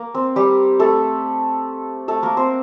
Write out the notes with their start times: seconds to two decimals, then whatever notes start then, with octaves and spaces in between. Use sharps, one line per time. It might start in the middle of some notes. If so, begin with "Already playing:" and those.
Already playing: A#3
0.14 C4
0.36 G3 G4
0.79 A3 A4
2.08 A3 A4
2.22 A#3 A#4
2.37 C4 C5